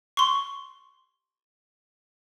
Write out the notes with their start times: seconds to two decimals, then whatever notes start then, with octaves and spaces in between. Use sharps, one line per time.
0.17 C6 C#6